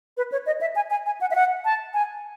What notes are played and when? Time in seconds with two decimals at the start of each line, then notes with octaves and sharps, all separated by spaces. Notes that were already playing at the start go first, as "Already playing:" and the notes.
0.17 B4
0.32 C#5
0.46 D#5
0.61 E5
0.76 G#5
0.90 G#5
1.06 G#5
1.21 F#5
1.31 E5
1.35 F#5
1.65 A5
1.94 G#5